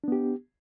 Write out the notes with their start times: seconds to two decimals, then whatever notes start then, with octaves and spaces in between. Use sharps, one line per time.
0.04 D4
0.08 B3
0.12 G4